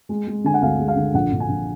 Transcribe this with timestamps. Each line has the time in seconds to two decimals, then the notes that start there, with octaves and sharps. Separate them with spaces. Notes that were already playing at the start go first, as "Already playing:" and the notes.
0.09 G#3
0.27 G#3
0.44 D3 G#5
0.54 F#5
0.62 D2 F5
0.79 G#3
0.88 F5
0.96 D3
1.14 A#1 F#5
1.32 A#1
1.40 G#5
1.49 A#1